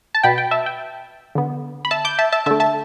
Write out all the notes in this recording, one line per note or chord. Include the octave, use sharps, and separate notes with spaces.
A5
B2 B3 G5 B5
G5
E5 A5
G5
D3 B3
B5
E5 A5
D6 G6
E5 A5
E5 A5
D3 A3 E5 A5
E5 A5